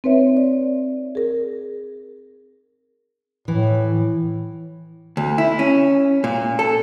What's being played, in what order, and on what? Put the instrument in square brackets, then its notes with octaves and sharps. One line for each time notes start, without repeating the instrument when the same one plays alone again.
[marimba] C4 D#4 B4 C#5 E5
D5
G#4 A#4
[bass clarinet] A2 [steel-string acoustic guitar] E3
[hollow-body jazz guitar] D2
E4
C#4
A#2
A4